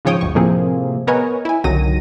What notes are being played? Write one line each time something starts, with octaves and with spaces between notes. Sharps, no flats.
G#2 C#3 F3 C#5 G5 D#6
G1 D2 C#6
A2 C3 F3 A#3 C4 G#4
B3 A#4 B4 C#5 D#5 G#5
E4 G#5
G1 C2 D#3 F#3 A#6 D#7